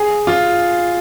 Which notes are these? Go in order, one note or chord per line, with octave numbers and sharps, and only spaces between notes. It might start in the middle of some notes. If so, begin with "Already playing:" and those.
Already playing: G#4
F4